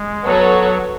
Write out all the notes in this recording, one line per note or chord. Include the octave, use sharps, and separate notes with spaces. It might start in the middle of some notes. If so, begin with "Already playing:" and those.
Already playing: G#3
F#3 B3 F#4 A4 C#5